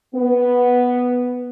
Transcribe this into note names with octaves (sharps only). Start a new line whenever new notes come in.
B3